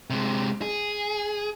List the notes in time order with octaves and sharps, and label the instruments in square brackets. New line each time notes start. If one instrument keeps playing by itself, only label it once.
[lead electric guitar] C3 G#3
G#4